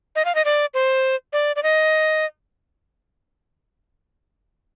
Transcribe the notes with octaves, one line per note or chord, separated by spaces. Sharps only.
D#5
F5
D#5
D5
C5
D5
D5
D#5